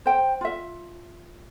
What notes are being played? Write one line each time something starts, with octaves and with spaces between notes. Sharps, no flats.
C5 G5
F4 E5